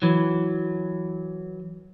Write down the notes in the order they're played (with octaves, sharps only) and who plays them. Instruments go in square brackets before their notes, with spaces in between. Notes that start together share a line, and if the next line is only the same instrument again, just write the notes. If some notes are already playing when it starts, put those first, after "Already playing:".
[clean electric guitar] E3 F#3